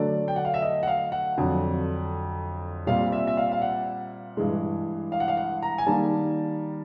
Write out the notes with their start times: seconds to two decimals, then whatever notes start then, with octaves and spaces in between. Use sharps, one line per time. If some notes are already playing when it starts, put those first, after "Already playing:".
Already playing: D3 F#3 A3 D5
0.28 G5
0.36 F#5
0.45 F5
0.54 E5
0.62 D#5
0.83 F#5
0.88 F5
1.12 F#5
1.37 F2 D3 F#3
2.87 A#2 G3 C4 F5
3.12 E5
3.27 E5
3.37 F5
3.52 F5
3.62 F#5
4.37 G2 E3 G#3
5.12 F5
5.20 F#5
5.28 F5
5.37 F#5
5.62 A#5
5.78 G#5
5.87 D#3 G3 A#3 A5